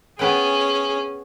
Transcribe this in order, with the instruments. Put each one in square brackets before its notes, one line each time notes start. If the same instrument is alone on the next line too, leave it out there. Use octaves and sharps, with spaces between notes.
[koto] B3 B4 G5 [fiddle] C#4 [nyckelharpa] G#4